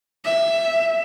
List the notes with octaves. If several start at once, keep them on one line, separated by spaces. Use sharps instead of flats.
E5